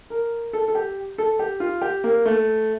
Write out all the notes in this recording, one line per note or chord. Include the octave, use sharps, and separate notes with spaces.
A#4
A4
A4
G4
A4
G4
F4
G4
A#3
A3